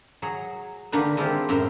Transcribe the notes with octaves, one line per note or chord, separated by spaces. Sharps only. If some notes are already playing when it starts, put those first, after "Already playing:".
F#3 G#4 A#5
D3 D#3 A#3 D4 G4 B4
G#3 C4 E4 F4 G4 C5
F#2 A2 C5 E5 G5 A#5